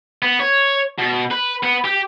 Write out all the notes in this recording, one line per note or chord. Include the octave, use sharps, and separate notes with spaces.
B3
C#5
B2
B4
B3
G4